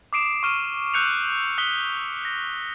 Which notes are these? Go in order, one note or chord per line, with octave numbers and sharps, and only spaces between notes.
D6 D#6 C7 D7 E7
C#6 F6 D#7 E7
E6 F#6 G6 C#7 F7
D#6 F#6 B6 G7
A#6